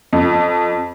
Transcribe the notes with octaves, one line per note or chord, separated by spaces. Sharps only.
F2